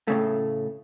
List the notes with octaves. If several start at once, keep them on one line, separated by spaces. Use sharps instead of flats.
A2 C#3 A3